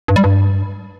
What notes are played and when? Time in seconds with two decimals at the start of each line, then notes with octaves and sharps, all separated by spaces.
0.08 G2
0.16 G3
0.24 G2